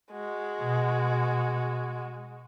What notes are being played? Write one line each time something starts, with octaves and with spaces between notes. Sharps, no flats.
G#3 F#4
B2